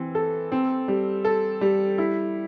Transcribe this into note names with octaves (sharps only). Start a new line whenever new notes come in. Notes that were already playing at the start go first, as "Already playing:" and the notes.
Already playing: E3 C4
A4
C4
G3
A4
G3
E4